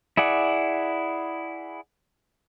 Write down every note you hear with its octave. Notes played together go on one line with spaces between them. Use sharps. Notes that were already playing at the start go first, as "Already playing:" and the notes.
E4 G#4 D5 F#5